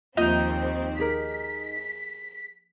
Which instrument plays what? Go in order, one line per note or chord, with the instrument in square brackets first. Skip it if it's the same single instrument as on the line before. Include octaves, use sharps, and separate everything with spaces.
[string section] D#2 C4 [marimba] F3 A#3 F4 [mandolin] D#4
[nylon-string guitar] G4 G#4 A#4 [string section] B6